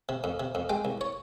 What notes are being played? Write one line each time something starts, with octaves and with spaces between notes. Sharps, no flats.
C3
F2
C3
F2
G#3 G5
C2
C#5